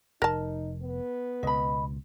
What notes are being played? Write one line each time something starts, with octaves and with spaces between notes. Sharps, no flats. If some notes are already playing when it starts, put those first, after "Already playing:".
F1 D#4 A#4 A5
B3
C#2 B2 D#5 B5